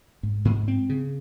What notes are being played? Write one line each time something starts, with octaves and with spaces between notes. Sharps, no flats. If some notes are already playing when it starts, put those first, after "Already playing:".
G#2
G#2
C4
C#3